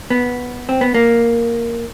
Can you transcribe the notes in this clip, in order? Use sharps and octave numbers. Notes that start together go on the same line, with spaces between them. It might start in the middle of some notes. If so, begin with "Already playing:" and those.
B3
C4
B3
A#3